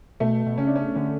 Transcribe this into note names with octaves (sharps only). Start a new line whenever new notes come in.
B2 A3
B2
C#3 C#4
D4
C#4
D3 C#4